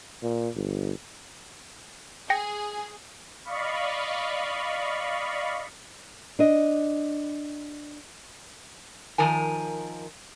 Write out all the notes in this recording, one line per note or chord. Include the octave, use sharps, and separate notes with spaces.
A#2
G1
G#4 G5 A#6 C#7
D5 D#5 F5 B5 C#6
D4 D#5
D#3 F3 A#4 G#5